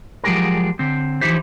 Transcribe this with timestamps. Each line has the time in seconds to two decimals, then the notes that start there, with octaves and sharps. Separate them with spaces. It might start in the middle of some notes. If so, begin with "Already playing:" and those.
0.24 F3 F#3 G#3 G4 G#4 A#4
0.79 D3 C4
1.21 E3 F3 D#4 E4 G4 C5